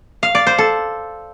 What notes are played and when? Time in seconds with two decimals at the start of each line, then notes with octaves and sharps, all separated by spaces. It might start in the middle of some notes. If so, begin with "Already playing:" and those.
0.23 F5
0.35 D5
0.47 C5
0.58 A4